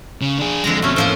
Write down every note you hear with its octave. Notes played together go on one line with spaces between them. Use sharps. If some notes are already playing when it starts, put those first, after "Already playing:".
C#3
D4 G#4
F2 D3 G#3 A#5
B2 A3 C#4
A2 F3 A#3 C5